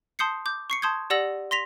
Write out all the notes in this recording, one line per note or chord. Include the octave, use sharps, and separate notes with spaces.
A5 C6 D#6 G6 C7 C#7
D6 G6
C#6 C7 C#7
A5 C6 D#6 G6 G#6
G4 D5 F#5 E6 A#6 F#7
C6 A#6 B6 F7